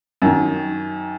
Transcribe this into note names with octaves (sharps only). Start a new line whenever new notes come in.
F#2 D#3